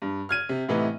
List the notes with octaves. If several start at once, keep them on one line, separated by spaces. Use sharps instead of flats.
G2
F6 G#6 D#7
C3
A2 C3 E3 B3 D#4